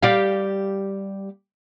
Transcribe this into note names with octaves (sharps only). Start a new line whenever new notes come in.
G3 G4 F5